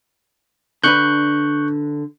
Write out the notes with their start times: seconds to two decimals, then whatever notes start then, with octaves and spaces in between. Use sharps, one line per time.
0.84 D3 D4 B4 C#6 F#6 G6